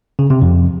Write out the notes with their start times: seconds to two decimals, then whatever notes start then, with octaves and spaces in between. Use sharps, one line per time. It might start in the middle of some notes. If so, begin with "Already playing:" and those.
0.19 C#3
0.30 C3
0.42 F2